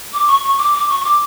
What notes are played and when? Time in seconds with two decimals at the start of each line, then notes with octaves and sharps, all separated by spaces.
0.13 D6
0.28 C#6
0.44 C#6
0.58 D6
0.74 D6
0.89 C#6
1.01 C#6
1.05 D6